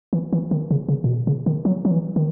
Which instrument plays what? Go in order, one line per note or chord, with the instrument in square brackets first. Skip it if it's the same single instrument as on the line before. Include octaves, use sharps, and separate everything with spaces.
[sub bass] E3
E3
D#3
C#3
C#3
A#2
B2
C#3
D#3
F#3
F#3
E3
D#3